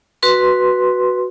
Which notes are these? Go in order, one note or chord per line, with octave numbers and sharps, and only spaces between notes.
F#4 B4 C6